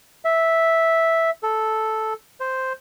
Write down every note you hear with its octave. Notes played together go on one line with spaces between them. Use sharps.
E5
A4
C5